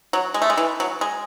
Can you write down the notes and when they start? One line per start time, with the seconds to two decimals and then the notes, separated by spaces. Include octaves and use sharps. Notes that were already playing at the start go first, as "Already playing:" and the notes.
0.13 F#3
0.34 G#3
0.42 A3
0.50 G#3
0.57 E3
0.80 F#3
1.01 G#3